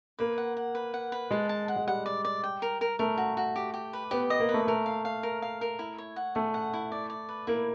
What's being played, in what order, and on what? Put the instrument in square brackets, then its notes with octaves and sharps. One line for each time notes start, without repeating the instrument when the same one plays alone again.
[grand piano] A#3 [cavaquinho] B4
[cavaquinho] F#5
F#5
B4
F#5
B4
[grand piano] G#3 [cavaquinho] A5
[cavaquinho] A5
F#5
[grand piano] G#3
[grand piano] G3 [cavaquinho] F#5
[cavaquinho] D5
D5
G5
A#4
A#4
[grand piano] A3 [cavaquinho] A#4
[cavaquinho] F#4
F#4
G4
G4
B4
[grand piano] B3 [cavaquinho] G4
[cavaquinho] D#5
[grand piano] A#3
[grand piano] A3 [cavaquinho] B4
[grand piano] A3 [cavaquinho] A#4
[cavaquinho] F5
F5
A#4
F5
A#4
E4
C#5
F#5
[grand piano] A3 [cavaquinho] G#4
[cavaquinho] F#5
E4
D5
D5
B4
[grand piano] A#3 [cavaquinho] E4